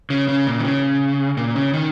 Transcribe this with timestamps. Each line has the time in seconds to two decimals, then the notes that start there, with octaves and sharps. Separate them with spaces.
0.10 C#3
0.28 C#3
0.47 A#2
0.59 D#3
0.65 C#3
1.37 A#2
1.56 C#3
1.74 D#3